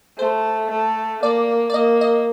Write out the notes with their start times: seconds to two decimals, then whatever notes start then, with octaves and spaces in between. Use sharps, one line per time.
0.18 A3 C5
0.71 A3
1.23 A#3 D5
1.70 D5
1.74 A#3 D#5
2.01 D#5